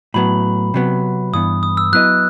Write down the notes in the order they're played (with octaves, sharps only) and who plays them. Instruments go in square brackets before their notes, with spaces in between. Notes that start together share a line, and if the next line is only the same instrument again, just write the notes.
[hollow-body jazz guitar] A2 F#3 B3 [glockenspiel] B5
[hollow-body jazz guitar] C3 F#3 B3
[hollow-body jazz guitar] G2 E3 B3 [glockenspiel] D#6
[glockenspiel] D#6
E6
[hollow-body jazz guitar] F#3 B3 E4 B4 D#5 [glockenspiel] F#6